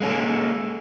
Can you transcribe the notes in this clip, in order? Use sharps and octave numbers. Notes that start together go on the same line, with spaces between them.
G#3 A#3 C#4 A4